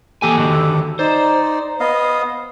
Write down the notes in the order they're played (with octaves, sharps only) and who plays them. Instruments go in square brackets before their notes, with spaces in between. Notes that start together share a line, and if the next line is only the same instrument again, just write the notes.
[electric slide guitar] E3 A#3 G#5 [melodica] G4 A4
[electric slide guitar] D3 D#3 F#4
[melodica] D#4 D5 [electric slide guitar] C5
[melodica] B3 D#5 F5